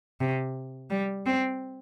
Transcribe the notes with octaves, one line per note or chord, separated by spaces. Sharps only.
C3
G3
C4